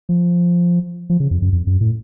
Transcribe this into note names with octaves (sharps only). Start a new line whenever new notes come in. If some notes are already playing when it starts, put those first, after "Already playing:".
F3
F3
C#3
F2
F#2
F2
F#2
A2